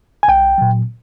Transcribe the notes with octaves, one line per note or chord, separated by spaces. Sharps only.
G#5
B1 G5
A#2 F#3